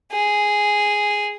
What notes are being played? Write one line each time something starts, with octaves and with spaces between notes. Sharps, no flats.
G#4